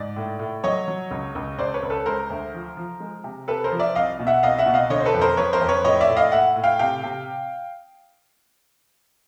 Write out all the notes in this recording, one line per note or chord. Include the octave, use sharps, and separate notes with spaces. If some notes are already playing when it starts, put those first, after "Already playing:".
Already playing: G#2 D5
A2
A2
F#3 C#5 D#5
F#3
C#2
C#2
C#2 C5 D5
B4 C#5
C#2
A4 B4
G#3 A#4 C5
D2
F3
F3
G#3
C3
C3 A4 B4
A#4 C5
F3
D5 E5
C2 D#5 F5
B2
E5 F#5
C2 D#5 F5
E5 F#5
B2
D#5 F5
D3 C#5 D#5
C5
A4 B4
F2
A#4 C5
F2 B4 C#5
A#4 C5
F2
B4 C#5
A2 C#5 D#5
D5 E5
A2
D#5 F5
A2 E5 F#5
A2
F5 G5
C3 F5 G5
C3